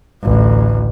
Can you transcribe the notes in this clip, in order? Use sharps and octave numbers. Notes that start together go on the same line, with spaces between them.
A1 D2